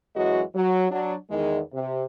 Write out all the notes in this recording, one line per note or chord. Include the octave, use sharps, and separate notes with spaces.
F#2 E3 F#3 G#3 F#4 D#5
F#3
F#3 D4
E2 D#3 G#3
C3